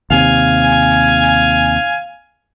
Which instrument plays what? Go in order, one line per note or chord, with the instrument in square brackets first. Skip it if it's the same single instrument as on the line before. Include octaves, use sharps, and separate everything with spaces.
[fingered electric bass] D#2 C3 [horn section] F5 G#5